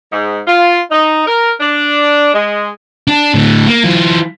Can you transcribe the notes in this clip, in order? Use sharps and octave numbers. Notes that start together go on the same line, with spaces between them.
G#2
F4
D#4
A#4
D4
G#3
D4
A2 D3
A#3
E3 F4